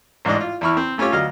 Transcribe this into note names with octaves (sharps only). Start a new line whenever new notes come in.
A1 G#2 D4 D5 D#5
F4
E2 E3 E4 B5 C#6 F6
C4
A3 C#4 F4 G4 C#5
D2 F#3 D#5 F5 F6